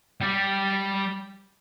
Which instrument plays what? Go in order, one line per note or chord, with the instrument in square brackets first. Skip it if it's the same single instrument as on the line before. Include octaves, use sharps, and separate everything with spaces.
[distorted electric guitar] G3 G4